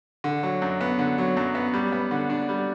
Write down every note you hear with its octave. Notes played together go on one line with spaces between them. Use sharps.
D3
F#3
F#2
B3
D3
F#3
F#2
B3
G3
B3
D3
D4
G3